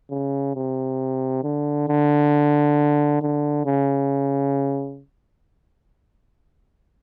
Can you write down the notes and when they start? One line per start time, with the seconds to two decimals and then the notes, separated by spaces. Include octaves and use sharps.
0.11 C#3
0.55 C3
1.44 D3
1.88 D3
3.22 D3
3.65 C#3